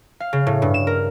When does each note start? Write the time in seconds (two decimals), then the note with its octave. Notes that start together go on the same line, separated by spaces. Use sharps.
0.20 F5
0.33 C#3
0.47 A2
0.62 G2
0.74 E7
0.87 A#4